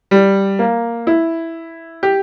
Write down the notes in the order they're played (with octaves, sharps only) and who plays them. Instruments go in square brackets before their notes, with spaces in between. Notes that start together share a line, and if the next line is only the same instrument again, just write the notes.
[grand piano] G3
A#3
E4
G4